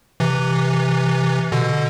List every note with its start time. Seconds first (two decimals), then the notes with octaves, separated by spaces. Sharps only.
0.20 C3 E3
1.52 B2 D3